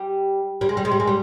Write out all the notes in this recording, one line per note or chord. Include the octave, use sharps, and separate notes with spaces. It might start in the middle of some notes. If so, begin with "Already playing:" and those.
Already playing: G3
G3
G#3
G3
G#3
G3
G#3
G3